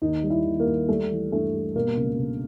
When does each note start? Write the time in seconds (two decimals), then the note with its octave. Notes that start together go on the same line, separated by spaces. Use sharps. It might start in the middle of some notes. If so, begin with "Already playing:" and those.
0.02 D#2 D#4
0.23 G3
0.30 E4
0.45 D#2
0.60 A#3
0.67 D#2
0.88 G3 A3
1.11 E3
1.32 G2 A3
1.54 G3
1.75 B2 A#3
1.97 C#2
2.19 C#2